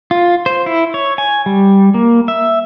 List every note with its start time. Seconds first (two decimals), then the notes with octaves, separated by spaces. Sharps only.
0.11 F4
0.46 C5
0.66 E4
0.94 C#5
1.18 G#5
1.46 G3
1.94 A#3
2.28 E5